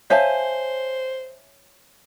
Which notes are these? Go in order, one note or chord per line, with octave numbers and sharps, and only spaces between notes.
C5 C#5 E5 F5 G#5 A5